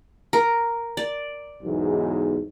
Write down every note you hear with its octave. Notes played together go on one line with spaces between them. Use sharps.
A#4
D5
B1 E2 G#2